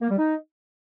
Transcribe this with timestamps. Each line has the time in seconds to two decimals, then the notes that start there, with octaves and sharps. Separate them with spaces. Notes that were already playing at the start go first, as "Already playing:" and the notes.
0.01 A#3
0.10 G3
0.18 D#4